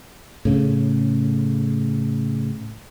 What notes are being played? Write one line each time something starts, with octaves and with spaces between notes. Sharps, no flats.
A2 C#3